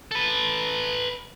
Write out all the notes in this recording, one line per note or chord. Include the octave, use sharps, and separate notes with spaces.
A4 B4